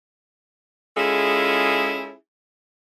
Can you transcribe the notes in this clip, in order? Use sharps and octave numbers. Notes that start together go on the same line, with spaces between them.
G#3 C#4 E4 F4 G#4 A4